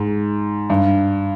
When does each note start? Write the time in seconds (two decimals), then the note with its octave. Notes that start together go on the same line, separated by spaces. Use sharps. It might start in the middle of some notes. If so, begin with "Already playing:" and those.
Already playing: G#2
0.70 G2